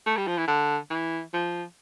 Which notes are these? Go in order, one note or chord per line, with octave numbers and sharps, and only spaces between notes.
A3
G3
F3
E3
D3
E3
F3